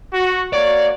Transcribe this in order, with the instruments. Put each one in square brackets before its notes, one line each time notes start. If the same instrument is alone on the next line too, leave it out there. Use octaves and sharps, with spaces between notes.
[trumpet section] F#4
[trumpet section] A#3 F#4 C#5 [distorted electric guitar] D5